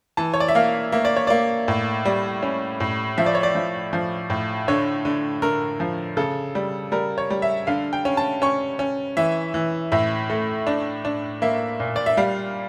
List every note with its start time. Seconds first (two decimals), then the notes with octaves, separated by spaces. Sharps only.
0.17 E3 A5
0.34 C#5
0.40 D5
0.48 E5
0.55 A#3 F5
0.92 A#3 E5
1.05 D5
1.16 C#5
1.27 A#3 D5
1.68 A2
2.05 G3
2.43 C#4
2.80 A2
3.18 F3 E5
3.26 D5
3.35 C#5
3.43 D5
3.55 F3
3.93 F3
4.30 A2
4.68 D3 C#5
5.05 D3
5.42 D3 A#4
5.80 F3
6.17 C#3 A4
6.55 G3
6.92 G3 A#4
7.18 C#5
7.30 G3
7.42 E5
7.67 D3 F5
7.93 G5
8.05 C#4
8.17 A5
8.42 C#4 C#6
8.79 C#4
9.17 E3 E5
9.54 E3
9.92 A2 E5
10.30 A3
10.67 D4
11.05 D4
11.42 A#3 E5
11.80 A#2
11.96 D5
12.06 E5
12.17 G3 F5